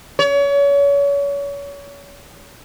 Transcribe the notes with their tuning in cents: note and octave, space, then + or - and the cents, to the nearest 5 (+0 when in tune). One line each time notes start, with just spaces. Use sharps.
C#5 +35